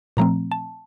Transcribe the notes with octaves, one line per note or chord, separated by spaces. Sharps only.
A#2 F3 A3 C4 A#5
A5